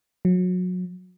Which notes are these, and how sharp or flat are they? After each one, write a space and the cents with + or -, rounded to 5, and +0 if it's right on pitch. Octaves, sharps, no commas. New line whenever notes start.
F#3 -30